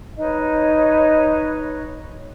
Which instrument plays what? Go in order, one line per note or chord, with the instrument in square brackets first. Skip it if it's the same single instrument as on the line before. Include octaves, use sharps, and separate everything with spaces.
[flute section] D#4 B4 C#5 D#5